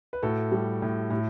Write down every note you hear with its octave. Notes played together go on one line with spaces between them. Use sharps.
B4
A2 F#4 A4
G3
A2
A2